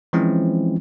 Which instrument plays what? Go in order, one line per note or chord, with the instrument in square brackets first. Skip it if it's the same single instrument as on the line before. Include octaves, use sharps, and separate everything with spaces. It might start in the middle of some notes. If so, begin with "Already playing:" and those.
[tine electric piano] E3 F3 G#3 C4 C#4 E4